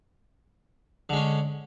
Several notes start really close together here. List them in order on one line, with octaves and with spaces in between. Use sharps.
D3 G#3 C#4